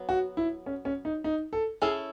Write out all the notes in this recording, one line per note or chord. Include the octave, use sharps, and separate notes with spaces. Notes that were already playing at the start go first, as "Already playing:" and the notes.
Already playing: F#3 B3
F#4
E4
C#4
C#4
D#4
D#4
A4
C#4 E4 G#4 A4